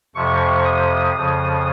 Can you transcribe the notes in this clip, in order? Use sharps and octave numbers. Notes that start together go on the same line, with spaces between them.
F2 C3 F3 C#6
D#6
F2 C#3 F3